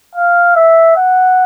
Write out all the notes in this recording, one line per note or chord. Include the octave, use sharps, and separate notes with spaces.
F5
E5
F#5